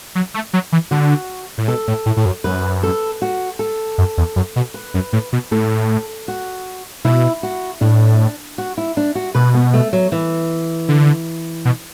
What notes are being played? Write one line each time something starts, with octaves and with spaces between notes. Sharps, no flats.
F#3
A3
F#3
E3
D3 F#4
A2
B2 A4
A2
A2
A2
F#2
F#2 B4
A4
F#4
A4
F#2
E2
F#2
B2
B4
F#2
A2
B2
A2 A4
F#4
B2 E4
F#4
A2 D4
F#4
E4
D4
F#4
B2 B4
B3
A3
F#3
E3
D3
B2